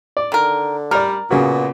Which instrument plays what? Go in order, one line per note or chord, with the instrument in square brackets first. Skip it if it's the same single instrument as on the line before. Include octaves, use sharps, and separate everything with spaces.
[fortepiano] D5
[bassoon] D3 [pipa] D#3 A#4
[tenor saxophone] G3 [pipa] A#4 [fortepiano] D5 F6
[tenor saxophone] A#2 [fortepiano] C#3 F#4 [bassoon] B3